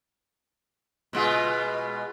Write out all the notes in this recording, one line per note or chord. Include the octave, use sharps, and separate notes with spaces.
B2 G#3 F4